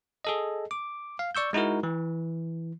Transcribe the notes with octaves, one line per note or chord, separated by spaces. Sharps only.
G#4 A4 D#5
D6
F5
D5 C#6 E6 G6
G#3 D#4 E4 F#4 A#4
E3